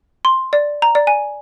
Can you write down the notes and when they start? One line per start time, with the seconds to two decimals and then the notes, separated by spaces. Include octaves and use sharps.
0.25 C6
0.53 D5
0.82 A#5
0.95 D5
1.07 G#5